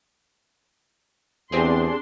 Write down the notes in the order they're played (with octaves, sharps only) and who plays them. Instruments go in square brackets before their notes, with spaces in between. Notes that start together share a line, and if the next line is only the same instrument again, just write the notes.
[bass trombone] E2 [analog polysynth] C4 G4 G#4 [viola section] D4 C6